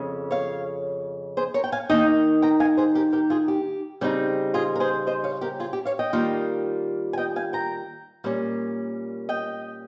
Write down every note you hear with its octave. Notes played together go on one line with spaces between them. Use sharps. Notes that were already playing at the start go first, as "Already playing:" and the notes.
Already playing: F2 C#3
C#5 F5
G#4 C5
A#4 C#5
G5
F5 G#5
D#3 A#3 D#4 D#5 G5
G5 A#5
F5 G#5
G#4 C5
G4 A#4
G4 A#4
F4 G#4
G4
C#3 G3 C4 D#4
F4 G#4
A#4
G#4 C5
C5 D#5
C#5 F5
G4 A#4
F4 G#4
G4
C#5 F5
D#5 G5
D#3 G3 A#3 F4
G#5
D#5 G5
F5 G#5
G5 A#5
A#2 G3 A#3 C#4
D#5 G5